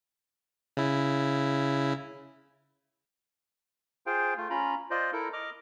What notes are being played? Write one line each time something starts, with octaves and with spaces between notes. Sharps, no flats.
C#3 E4
F4 G#4 C5 F5 G5
A3 F4
C#4 F4 A#5 B5
F4 C5 D5 D#5
E4 A4 A#4
D#5 D6 F6